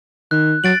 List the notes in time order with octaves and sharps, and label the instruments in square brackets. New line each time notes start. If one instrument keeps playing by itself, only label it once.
[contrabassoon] D#3 [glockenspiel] F#6
[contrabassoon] F#3 [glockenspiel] A6 D7 F#7